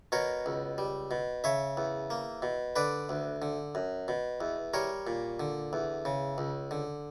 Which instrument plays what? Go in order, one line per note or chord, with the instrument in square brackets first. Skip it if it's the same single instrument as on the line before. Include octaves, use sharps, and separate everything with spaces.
[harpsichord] B2 A#4 C#5
C#2
G3
B2
C#3 C#5 E5
E2
A#3
B2
D3 B4 D5
D2
D3
F#2
B2
E2
G3 A#4 C#5
A#2
D3
E2
C#3
C#2
D3